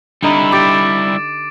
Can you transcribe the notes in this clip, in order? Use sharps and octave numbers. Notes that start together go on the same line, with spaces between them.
D3 G3 D#4 E4
G4 D6 A6 D7